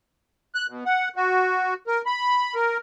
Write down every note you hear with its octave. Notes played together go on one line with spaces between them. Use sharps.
F#6
B2
F#5
F#4
A#4
B5
A#4